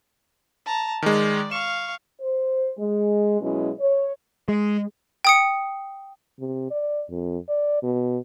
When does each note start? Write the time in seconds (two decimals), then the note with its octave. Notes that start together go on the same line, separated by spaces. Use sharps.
0.66 A5 A#5
1.02 D#3 G#3 D5
1.51 F5 C#6 E7
2.20 C5
2.78 G#3
3.41 B2 F#3 G#3 C#4 E4
3.80 C#5
4.48 G#3
5.25 G5 D#6 C#7
6.39 C3
6.71 D5
7.09 F2
7.48 D5
7.83 B2